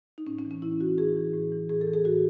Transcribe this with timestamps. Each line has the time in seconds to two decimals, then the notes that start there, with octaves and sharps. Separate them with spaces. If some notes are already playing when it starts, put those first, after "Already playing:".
0.18 D#4
0.27 A2 C#4
0.39 C#4
0.45 E3
0.51 C#4
0.62 A2 E4
0.80 E3 F#4
0.98 A2 G#4
1.16 E3
1.34 A2
1.52 E3
1.69 A2 G#4
1.81 A4
1.87 E3
1.94 G#4
2.05 A2 F#4